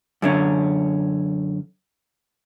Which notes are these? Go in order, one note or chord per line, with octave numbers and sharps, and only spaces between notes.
F#2 D3 C#4